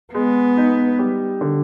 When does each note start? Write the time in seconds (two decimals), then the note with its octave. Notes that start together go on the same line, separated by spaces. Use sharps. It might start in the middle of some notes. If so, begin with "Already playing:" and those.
0.14 G#3 B3
0.57 D#4
0.99 G3
1.41 D3